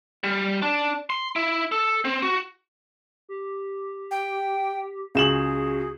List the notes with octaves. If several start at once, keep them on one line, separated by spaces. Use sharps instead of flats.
G3
D4
C6
E4
A4
C4
F#4
G4
G5
C#2 F#4 G#4 E7 F#7